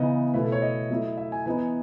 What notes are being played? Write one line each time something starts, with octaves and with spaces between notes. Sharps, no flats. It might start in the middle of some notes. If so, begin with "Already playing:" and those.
Already playing: C#3 E3 B3 D#4 D#5
B2 A3 E4 B4
A4
C#5
D#5
F#3 A3 E4
E5
G#5
E3 B3 D#4 G#5